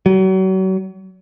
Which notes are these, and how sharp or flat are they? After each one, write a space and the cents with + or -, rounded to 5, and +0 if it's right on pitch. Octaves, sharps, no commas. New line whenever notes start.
F#3 +35